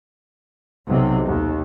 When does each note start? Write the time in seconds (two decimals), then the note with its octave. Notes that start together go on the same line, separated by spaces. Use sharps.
0.87 B1 C3
1.25 D#2